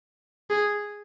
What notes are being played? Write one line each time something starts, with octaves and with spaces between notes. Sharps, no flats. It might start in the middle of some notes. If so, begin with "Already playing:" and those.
G#4